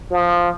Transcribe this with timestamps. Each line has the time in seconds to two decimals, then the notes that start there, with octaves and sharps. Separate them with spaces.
0.11 F3